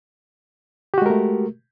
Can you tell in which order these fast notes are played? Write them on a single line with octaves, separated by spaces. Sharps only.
G4 F#4 G#3 A#4 A3